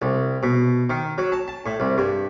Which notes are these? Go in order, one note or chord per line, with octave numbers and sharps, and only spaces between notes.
C2
B2
D#3
F#3
A5
A5
A2
C2
G2